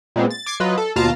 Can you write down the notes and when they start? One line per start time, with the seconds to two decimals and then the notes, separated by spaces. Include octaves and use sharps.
0.16 A#2 G#3 B3 C4
0.30 A6
0.46 D6 G#6 A6 C7
0.60 F#3 F4 B4 D#5
0.78 A4
0.96 D#2 B2 F4 F5 A5 A#5